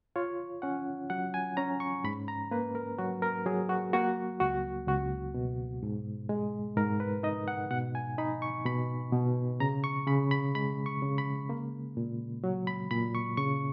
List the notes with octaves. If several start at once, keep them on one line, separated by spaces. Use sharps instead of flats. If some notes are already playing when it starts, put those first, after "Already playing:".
F4 C#5
C#4 F#5
F#3 F#5
G#5
C#4 A#5
C#6
G#2 B5
A#5
A#3 B4
A#4
F#3 F#4
A#4
F#3 G#4
F#4
A#3 F#4
C#2 F#4
C#2 F#4
B2
G#2
G#3
G#2 A#4
B4
D#4 D#5
F#5
B2 F#5
G#5
D#4 B5
C#6
B2 B5
B2
C#3 A#5
C#6
C#3 B5
B5
G#3 B5
C#6
C#3
B5
A#3
A#2
F#3
B5
A#2 B5
C#6
C#3 C#6